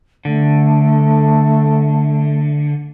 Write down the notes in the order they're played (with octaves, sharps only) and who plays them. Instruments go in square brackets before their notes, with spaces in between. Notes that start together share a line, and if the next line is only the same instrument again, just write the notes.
[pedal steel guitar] D3 [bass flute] A3